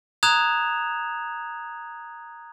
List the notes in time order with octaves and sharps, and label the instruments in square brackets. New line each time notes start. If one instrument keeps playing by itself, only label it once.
[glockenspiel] A#5 D#6 F#6 G#6 E7 F7